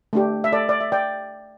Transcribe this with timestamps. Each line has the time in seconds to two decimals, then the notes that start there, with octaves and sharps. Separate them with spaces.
0.13 A3 D4 G4
0.44 E5
0.52 A4 D5
0.69 D5
0.80 E5
0.92 D5 G5